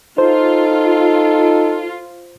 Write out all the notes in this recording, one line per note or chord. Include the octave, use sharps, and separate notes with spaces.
D#4 F4 A4 C5